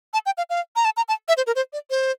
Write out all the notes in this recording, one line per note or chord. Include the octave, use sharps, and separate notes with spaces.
A5
G5
F5
F5
A#5
A5
A#5
A5
E5
C5
A#4
C5
D5
C5